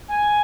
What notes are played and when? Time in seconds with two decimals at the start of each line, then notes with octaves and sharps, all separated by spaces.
0.08 G#5